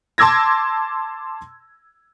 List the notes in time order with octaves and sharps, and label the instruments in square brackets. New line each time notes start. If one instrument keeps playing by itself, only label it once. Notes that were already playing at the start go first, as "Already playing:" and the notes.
[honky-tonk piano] A5 C6 D6 E6 G#6 A#6